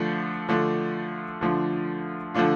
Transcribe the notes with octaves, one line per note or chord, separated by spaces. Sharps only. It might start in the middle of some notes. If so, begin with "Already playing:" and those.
Already playing: D3 F3 A3 D4 F4
D3 F3 A3 D4 F4
D3 F3 A3 D4 F4
D3 F3 A3 D4 F4